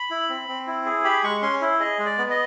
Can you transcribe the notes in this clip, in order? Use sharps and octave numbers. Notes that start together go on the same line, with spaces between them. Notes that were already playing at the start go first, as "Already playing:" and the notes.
Already playing: B5
E4
C4
C4
E4
G#4
G4 B5
G#3 C#6
C#4 C6
E4
G#4 D#5
G#3
D5
B3
D#5